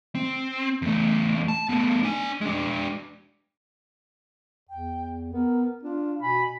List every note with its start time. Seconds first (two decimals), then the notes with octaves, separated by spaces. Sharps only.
0.15 C4
0.82 E2 A3
1.48 A5
1.69 A3 B3
2.03 D4 G#5
2.41 G#3 D4
4.69 E2 G5
5.33 B3 A#4
5.83 D4 F4
6.22 B2 G#5 B5